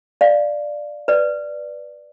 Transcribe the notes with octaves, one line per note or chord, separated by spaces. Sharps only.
D5 F5
B4 D5